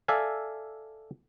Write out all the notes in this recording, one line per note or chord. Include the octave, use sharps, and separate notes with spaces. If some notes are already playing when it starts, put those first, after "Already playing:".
A4 D5 E5 F5 G#5